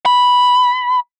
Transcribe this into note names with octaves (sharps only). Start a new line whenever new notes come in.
B5